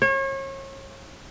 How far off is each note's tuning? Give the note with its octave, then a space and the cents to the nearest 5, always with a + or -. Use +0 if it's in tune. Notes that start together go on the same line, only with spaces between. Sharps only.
C#5 -35